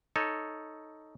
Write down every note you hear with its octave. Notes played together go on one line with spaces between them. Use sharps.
D#4 A4 C#5